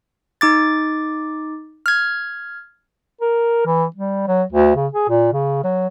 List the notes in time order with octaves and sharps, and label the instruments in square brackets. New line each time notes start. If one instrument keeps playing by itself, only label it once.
[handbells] D#4 D6 A6
F6 G#6
[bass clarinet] A#4
E3
G3
F#3
D2
C#3
G#4
A#2
C#3
F#3